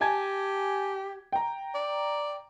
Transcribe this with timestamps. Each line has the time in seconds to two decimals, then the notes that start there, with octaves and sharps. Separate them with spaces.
0.01 G4 G#5 A5 G#6
1.32 G5 A#5
1.74 D5